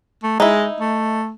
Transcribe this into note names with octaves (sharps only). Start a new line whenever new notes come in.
A3
G#3 D#4 E4
A3